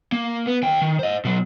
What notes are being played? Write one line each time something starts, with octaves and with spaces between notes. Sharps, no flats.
A#3
B3
D#2 G5
D#3
C5 D#5
B2 F#3